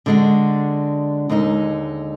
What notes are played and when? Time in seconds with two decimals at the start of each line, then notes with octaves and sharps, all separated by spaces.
0.06 D3 G#3 D4 F#4
1.30 D#2 D3 G#3 D#4